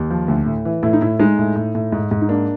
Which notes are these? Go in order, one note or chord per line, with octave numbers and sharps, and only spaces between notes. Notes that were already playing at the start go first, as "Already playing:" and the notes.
Already playing: D#2
F3
D2
A2
E3
A2 E4
D#4
A2 E4
G#3 D#4
A2
A2
A2
G#2
G#2
D#4
A#3 D4